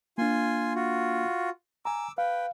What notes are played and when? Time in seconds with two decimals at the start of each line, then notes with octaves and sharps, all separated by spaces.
0.18 A#3 D4 F4 G#5 C6
0.76 F4 F#4
1.85 G#5 A#5 D6 E6
2.18 B4 F5 G5